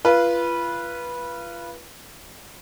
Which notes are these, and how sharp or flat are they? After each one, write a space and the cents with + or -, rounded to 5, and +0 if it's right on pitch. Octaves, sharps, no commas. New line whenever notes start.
F4 -30 B4 -15